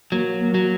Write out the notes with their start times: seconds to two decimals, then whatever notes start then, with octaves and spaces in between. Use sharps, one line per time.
0.12 F#3 A#3
0.41 A#3
0.54 F#3